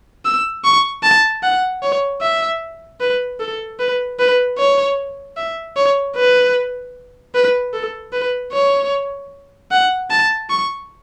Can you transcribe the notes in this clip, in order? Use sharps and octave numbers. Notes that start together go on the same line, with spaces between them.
E6
C#6
A5
F#5
C#5
E5
B4
A4
B4
B4
C#5
E5
C#5
B4
B4
A4
B4
C#5
F#5
A5
C#6